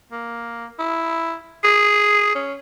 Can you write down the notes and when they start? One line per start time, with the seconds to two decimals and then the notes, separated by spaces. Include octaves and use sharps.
0.12 A#3
0.79 E4
1.64 G#4
2.35 C#4